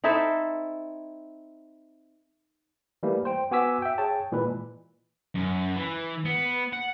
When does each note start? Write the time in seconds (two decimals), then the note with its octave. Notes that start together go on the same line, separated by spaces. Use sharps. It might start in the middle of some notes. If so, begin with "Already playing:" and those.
0.04 C4 D#4 E4 A4
3.03 E3 G3 A3 A#3
3.25 C5 G5
3.51 B3 F#4 G#5 D6 E6 B6
3.82 E5 G5
3.98 G#4 C#5 G5 A5
4.32 A#2 E3 G#3 B4
5.35 F#2
5.76 E3
6.25 B3
6.73 F#5